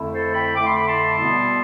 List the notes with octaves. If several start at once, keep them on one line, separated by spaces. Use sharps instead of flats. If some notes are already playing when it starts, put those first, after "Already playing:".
Already playing: F2 D3 A3 E4
A4 C5
G5 B5
F2 D3 A3 E4 D6
C6
B5
A5 C6
B2 G3 B3 E4